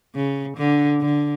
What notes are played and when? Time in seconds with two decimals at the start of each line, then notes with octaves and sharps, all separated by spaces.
0.15 C#3
0.58 D3
1.00 D3